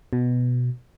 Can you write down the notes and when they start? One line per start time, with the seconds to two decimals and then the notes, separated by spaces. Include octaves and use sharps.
0.13 B2